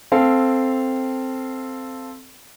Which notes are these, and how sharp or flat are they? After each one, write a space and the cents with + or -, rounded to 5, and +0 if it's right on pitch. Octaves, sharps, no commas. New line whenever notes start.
C4 +0 A4 +0 F5 -15